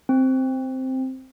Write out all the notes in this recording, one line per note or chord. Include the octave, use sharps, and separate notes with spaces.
C4